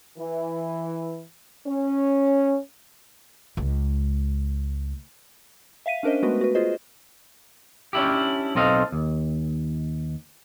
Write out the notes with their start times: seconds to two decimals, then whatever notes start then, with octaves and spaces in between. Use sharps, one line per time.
0.18 E3
1.67 C#4
3.57 C#2 G#3
5.86 E5 F5 B6 D#7
6.03 C#4 D4 A#4 C5 D#5
6.23 G#3 A3 B3 F#4 B4
6.41 F#4 B4
6.55 F4 G#4 C5 D#5
7.93 C#4 D4 E4 G4
8.55 B1 C4 A4 D#5 F5
8.92 D#2